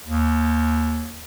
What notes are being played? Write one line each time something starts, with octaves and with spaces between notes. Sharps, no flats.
D#2